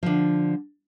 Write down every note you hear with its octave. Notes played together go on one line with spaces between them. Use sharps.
D3 F3